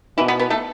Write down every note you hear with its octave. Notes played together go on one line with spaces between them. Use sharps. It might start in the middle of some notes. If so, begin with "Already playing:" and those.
B2 E3 E4
B3 B4
B3 B4
A3 A4